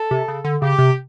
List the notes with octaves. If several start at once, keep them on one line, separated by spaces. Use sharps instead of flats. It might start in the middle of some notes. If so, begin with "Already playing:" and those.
Already playing: A4
C3
C#3
D3
C#3 G4
C3